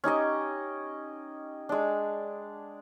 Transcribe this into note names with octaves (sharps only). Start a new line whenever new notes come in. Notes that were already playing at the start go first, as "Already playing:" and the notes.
C#4 D#4 G4 D#5
G#3 D4